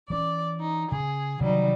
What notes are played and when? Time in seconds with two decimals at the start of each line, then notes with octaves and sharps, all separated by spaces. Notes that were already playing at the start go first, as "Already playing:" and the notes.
0.10 E3 C#4 D5
0.60 D#4
0.92 C#3 G#4
1.40 C3 D#3 E3 F#3 G3 D#4